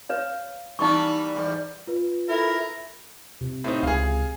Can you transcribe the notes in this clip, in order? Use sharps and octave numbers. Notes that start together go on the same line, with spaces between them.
B4 C#5 F5
E3 G3 A#3 D#4 C#6
E2 G#2 G3
F4 B4
E4 A4 A#4
C3
A2 C4 D#4
C#2 G#4 F5